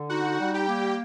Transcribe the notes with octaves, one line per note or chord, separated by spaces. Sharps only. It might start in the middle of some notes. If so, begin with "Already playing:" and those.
Already playing: D3
D#4 F#4 F#5
G3
G4 G5
A#3